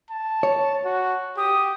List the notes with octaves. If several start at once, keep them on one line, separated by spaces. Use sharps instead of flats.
A5
C#5
F#4
G4 D#6